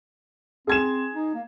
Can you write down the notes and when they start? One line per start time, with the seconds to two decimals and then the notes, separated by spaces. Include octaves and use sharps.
0.67 C4 G#4 G#6 E7
1.14 D#4
1.34 A#3